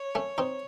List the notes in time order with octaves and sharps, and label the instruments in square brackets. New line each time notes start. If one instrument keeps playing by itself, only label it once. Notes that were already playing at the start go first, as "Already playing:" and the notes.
Already playing: [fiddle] C#5
[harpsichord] A3 C#4
C4 D#4